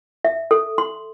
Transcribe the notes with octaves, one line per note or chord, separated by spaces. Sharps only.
E5
A4
C6